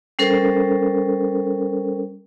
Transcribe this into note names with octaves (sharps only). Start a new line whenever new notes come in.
G3 C#4 A4 A#4 C5